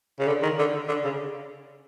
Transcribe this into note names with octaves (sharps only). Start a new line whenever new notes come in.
C#3
D3
D#3
D3
D3
C#3